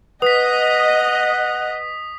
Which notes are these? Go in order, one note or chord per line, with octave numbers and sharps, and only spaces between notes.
B4 D#5 F#5 D#6 B6